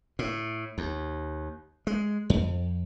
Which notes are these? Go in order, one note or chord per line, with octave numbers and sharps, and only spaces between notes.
A2
D#2
G#3
F2